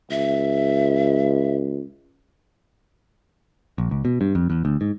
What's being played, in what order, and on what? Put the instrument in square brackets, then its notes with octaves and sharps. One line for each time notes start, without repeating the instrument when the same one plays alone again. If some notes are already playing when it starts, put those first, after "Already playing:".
[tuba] C#2 [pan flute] E5
[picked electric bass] A#1
C#2
B2
G2
F2
E2
D2
G#2